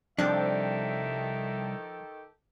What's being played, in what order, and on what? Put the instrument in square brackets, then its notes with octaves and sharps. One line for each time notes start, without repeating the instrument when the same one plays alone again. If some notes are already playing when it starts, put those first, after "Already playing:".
[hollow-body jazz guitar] C2 G3 D4 [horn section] D#3 G4 A4 [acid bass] F3 [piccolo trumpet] E5